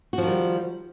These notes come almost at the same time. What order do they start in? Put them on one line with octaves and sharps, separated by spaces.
F#4 F3 D#3 G3